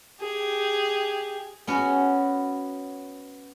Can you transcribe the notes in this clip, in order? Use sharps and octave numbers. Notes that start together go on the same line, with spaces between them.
G4 G#4
B3 C#4 F#4